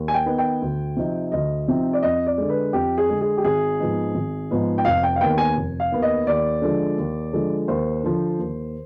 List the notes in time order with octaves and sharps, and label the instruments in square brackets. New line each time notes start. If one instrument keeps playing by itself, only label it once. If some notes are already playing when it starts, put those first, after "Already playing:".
Already playing: [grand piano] D#2
G#5
G5
D#3 B3 D#4
G5
D2
C3 F3 C4 D#4
D2 D#5
C3 F3 C4 D#4
D5
F2 D#5
D5
D3 G#3
B4
F2 G4
G#4
D3 G#3
G#4
G4
G#1 G#4
G#2 F3 B3 D#4
G#1
G#2 F3 B3 D#4
G5
F1 F5
G5
F5
D#2 D#3 B3 G5
G#5
F1
F5
D#2 D#3 B3
D#5
D#2 D5
D3 F3 G#3
D#2
D3 F3 G#3
D#2 C5
D3 F3
D#2